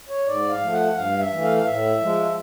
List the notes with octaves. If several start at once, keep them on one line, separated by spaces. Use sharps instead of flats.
C#5
G#2 D5
F5
F3 A3
F#5
G2 F5
E5
E3 A3
F5
F5
A2 E5
F3 G#3